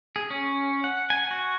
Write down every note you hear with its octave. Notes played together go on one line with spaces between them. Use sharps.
G#4
C#4
F#5
G#5
F#4